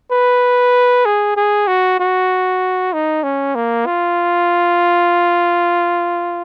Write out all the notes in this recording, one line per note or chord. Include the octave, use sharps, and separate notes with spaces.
B4
G#4
G#4
F#4
F#4
D#4
C#4
A#3
F4